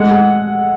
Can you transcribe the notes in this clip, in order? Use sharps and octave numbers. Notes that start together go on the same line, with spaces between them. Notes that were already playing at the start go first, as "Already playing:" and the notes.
Already playing: G#3 A3 F#5
G#3